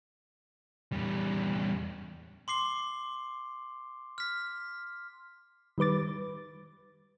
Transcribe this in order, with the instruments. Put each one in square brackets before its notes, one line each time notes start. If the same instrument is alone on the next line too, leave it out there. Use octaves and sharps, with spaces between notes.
[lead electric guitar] E2 G3
[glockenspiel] C6 D6 C7 G7
F6 B6
[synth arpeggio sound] D#3 G3 B4 D6 A6